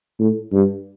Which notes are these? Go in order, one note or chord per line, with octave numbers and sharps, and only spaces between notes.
A2
G2